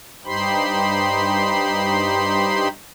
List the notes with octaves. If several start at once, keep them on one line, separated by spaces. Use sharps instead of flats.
G2 D#4 G4 C5 B5 C6